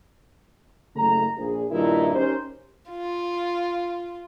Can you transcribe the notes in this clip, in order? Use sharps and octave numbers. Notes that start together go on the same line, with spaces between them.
F#1 C#3 A3 A#5
A#1 G#4
G2 A#2 D#3 D#4 E4
C#4 D#4 G4 A#4 C5
F4